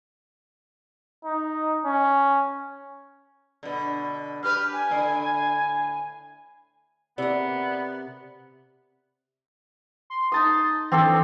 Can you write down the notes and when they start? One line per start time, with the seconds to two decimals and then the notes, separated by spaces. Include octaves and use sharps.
1.25 D#4
1.85 C#4
3.63 B2 D3
4.43 D4 G4 B4 F6
4.73 G#5
4.90 A2 D3
7.18 C3 B3 A#4 D5
10.10 C6
10.32 D#4 A5 D#6
10.92 E3 C4 D4 A4